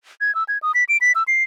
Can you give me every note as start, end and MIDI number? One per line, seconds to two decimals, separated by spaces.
0.21 0.34 92
0.35 0.44 88
0.48 0.58 92
0.63 0.72 87
0.75 0.84 95
0.89 0.97 98
1.01 1.12 95
1.15 1.23 88
1.28 1.44 96